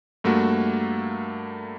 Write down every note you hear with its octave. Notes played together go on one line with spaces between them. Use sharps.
G2 A3 A#3 F#4